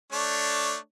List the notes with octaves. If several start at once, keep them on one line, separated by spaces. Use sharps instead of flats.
A3 D4 C#5